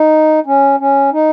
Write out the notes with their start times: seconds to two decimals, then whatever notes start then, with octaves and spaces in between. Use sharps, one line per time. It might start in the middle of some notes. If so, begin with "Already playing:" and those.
Already playing: D#4
0.46 C#4
0.80 C#4
1.13 D#4